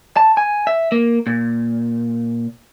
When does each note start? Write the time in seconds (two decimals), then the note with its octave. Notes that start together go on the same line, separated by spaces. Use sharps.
0.17 A5
0.37 G#5
0.67 E5
0.92 A#3
1.27 A#2